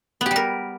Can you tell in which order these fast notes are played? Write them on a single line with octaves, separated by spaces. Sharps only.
B3 G4 G3 A#4